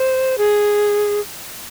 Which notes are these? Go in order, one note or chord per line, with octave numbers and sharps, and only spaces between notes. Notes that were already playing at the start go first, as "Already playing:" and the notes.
Already playing: C5
G#4